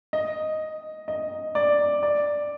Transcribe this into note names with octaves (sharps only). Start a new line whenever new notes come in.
D#5
D#5
D5
D5